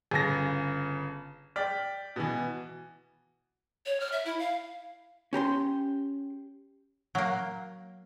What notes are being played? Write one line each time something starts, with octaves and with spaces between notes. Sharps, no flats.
G1 C#3 A#6
D5 G5 F6 B6
B2 E3
C#5
F6
E5
E4
F5
C#4 G4 A#5 C6
F#3 A#3